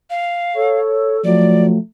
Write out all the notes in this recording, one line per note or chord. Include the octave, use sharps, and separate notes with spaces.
F5
A4 C#5
F3 F#3 A3 D5